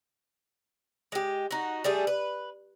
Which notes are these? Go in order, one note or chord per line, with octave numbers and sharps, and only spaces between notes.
G#3 G4
D#4 F#4
G3 A3 G#4
B4